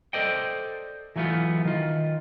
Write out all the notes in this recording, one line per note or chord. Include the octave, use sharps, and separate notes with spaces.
A4 C5 D5 D#5 G5
E3 F#3 A3 B3 F4
D#3 F4